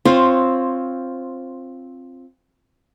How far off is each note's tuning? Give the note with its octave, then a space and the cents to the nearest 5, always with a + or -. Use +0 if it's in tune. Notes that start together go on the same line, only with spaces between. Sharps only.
C4 +10 F4 +0 C#5 +0